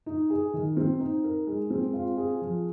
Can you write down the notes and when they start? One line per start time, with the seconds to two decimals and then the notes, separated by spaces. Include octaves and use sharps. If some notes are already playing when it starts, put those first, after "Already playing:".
0.06 D#4
0.30 G#4
0.53 D#3
0.77 C4
1.00 D#4
1.24 A#4
1.47 G#3
1.70 C4
1.94 F4
2.17 G#4
2.41 F3